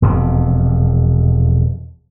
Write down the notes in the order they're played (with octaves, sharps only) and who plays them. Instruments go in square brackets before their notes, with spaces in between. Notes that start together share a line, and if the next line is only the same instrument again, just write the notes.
[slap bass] E1 F2 C3